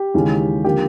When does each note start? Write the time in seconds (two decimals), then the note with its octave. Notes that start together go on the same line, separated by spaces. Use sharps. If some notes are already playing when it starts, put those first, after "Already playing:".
Already playing: G4
0.14 D#2 C#3 E3 G#3 C#4
0.65 D3 F3 A#3 G4